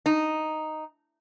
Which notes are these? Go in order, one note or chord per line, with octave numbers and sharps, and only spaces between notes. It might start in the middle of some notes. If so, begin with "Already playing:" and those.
D#4